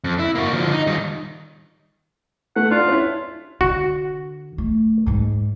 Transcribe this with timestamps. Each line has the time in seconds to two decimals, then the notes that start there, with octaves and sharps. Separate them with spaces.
0.04 F2
0.19 E4
0.35 A#3 F#4
0.52 D3 F3
0.72 D#4
0.87 D#3 G3
2.56 A3 F#5
2.71 D4 F4
2.88 C#4 E4
3.61 D3 F#4
4.58 A3
5.06 G#2 G#3